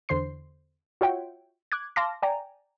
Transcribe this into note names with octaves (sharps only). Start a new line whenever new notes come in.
E2 D3 C5 C6 C7
F4 F#4 C#5 E5 F#5 G5
D6 F#6 G#6
F5 A5 C6 D6 F6 A#6
D5 G5 G#5 A#5